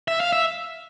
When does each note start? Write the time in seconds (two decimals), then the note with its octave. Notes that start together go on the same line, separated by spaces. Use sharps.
0.08 E5
0.20 F5
0.33 E5